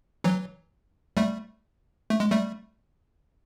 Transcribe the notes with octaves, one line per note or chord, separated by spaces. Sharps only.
E3 F#3
G3 A3
A3
G#3
G3 A3